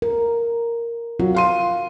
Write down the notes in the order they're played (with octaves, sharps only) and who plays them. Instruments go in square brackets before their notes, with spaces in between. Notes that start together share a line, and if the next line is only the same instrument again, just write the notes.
[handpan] A#4
[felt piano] F#3 [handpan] F4
[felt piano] F5 C6 D#7